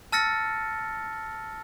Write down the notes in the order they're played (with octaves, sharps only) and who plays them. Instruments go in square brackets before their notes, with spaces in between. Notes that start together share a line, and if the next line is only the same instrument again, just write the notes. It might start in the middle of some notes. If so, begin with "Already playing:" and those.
[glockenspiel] A5 E6 F6 A6 A#6 C#7